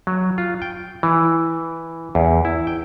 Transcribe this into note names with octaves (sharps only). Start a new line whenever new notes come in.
F#3
F4
G5
E3
E2
E4
G5